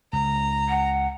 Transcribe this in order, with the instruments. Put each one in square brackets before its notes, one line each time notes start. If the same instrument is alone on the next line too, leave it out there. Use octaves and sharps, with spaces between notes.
[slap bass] C#2 [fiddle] A#5
[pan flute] F#5